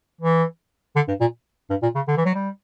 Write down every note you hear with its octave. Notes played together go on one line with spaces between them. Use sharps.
E3
D3
G2
A#2
G2
A#2
C#3
D3
E3
F#3
G3